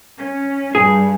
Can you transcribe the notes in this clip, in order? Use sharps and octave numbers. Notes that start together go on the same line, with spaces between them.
C#4
G2 G#4